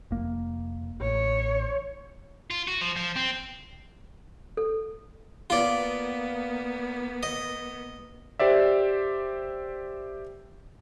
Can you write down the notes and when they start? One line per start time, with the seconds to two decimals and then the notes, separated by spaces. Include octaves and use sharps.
0.11 F1 A#3
1.01 A1 C#5
2.51 F4
2.68 F#4
2.81 F3
2.96 F3
3.16 C4
4.57 A4
5.50 A#3 B3 F4 D5
7.23 D#5
8.39 G4 C5 D5 E5